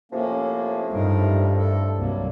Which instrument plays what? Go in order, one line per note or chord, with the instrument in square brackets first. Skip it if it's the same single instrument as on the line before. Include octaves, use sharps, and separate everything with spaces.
[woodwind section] A2 C3 F3 [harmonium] A#3 C#4
[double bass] G2 [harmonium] D#4 A#4
[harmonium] A4
[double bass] C2 [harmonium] F#3 G3 A#3